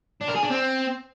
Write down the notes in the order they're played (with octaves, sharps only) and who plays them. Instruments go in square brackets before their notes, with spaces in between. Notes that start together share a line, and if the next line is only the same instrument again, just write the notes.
[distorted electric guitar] D4
A#4
G#4
D4
C4